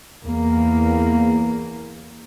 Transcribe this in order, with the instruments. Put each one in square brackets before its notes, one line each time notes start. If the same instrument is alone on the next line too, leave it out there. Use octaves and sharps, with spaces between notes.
[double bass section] E2 A#3